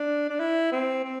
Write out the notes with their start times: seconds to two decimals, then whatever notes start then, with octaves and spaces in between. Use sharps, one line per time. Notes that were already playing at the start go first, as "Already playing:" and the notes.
Already playing: D4
0.30 D4
0.40 E4
0.72 C4
1.04 C4